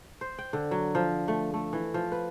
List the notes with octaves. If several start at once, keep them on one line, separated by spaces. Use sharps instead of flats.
C5
G5
D3
F#3
F3
A3
A3
E3
F3
B4